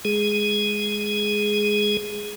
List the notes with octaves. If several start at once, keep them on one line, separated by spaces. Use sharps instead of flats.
G#3 G#4